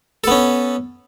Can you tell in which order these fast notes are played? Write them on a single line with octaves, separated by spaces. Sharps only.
A4 B3 C#4